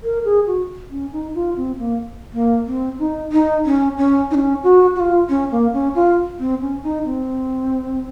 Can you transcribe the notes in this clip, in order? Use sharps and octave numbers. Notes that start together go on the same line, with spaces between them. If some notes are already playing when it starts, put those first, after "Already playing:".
A#4
G#4
F#4
C#4
D#4
F4
C4
A#3
A#3
C4
D#4
D#4
C#4
C#4
D#4
C#4
F#4
F#4
F4
C#4
A#3
C#4
F4
C4
C#4
D#4
C4